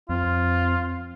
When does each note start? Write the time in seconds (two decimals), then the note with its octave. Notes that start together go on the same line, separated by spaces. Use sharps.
0.09 F2 C4 F4